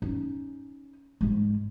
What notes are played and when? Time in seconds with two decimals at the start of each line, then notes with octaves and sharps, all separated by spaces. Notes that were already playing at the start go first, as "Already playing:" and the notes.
0.02 C#4 D#4
1.21 G#2 G#3